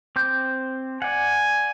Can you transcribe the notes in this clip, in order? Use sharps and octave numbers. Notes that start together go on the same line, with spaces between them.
C4 D6 G6
D5 F#5 G#5